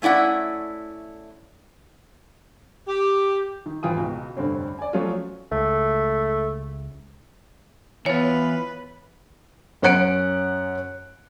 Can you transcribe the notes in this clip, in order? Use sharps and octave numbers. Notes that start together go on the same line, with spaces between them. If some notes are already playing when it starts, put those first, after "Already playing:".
A3 C#4 E4 D5 F#5
G4
D#3
G#1 E3 F4 G5 G#5 D#6
C#2 B2
F1 G2 D3 C4 C#4
D5 G#5
F3 F#3 A3 C#4 F4
C#2 A3
E3 B3 F4 B4 C#5
F#2 C#4 F#5 F#6 C#7 D7